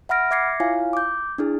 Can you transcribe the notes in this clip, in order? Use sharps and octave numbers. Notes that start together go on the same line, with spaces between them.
E5 F#5 B5 F6 A#6 D7
E5 D6 G#6 A#6 C7 C#7
E4 F4 C#5 F5 G#5
D6 G6
D4 E4 G#4